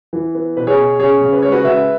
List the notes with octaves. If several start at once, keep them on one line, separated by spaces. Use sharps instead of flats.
E3
B3
B2 B4
G#4 C#5
B2
C#4 G#4 C#5
C#3
B4
G#3 C#5
F#4 B4
C#3 B4 E5